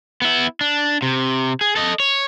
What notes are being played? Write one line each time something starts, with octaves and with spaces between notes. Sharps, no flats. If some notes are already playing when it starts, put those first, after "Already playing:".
B3 E4
D4
C3
G#4
A4 D#5
C#5